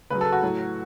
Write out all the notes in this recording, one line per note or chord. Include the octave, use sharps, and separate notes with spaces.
C#3 F#3 B4
A4
F#4
A2 F#3